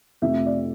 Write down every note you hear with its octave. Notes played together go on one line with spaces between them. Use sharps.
F2 C3 F3 A3 E5
D5